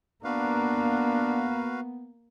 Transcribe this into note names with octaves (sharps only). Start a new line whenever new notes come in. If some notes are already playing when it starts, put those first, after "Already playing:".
A#3 B3 D4 F#4 B4 F5